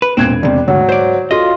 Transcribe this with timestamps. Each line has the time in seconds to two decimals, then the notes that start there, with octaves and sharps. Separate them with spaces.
0.02 B4
0.17 E1 A#2 C4 F#6 G#6
0.43 D#2 C3 G3
0.68 D2 G#2 F#3 F#5
0.89 C5 D5
1.31 F4 F#4 A4 D#5 F5